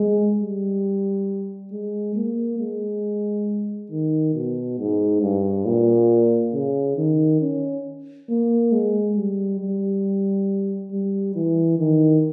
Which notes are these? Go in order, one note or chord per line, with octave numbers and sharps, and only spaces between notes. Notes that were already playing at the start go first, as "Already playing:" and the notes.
Already playing: G#3
G3
G#3
A#3
G#3
D#3
B2
G#2
G2
A#2
C#3
D#3
C#4
A#3
G#3
G3
G3
G3
E3
D#3